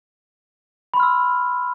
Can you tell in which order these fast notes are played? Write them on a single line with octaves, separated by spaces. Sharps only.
B5 C6 F6 E6